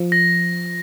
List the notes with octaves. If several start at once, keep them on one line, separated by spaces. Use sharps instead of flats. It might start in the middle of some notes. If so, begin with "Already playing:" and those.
Already playing: F3
A#6